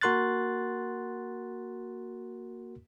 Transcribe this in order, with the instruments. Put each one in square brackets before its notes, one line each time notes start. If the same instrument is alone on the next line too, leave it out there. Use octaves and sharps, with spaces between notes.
[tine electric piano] A#3 F#4 A#4 C6 F#6 A6